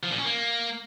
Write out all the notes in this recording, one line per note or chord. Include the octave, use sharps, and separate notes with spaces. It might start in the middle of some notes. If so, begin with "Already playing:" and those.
F3
A#2
C#4
A#3